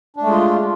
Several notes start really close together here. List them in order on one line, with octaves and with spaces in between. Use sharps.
D4 A3 G#3 F4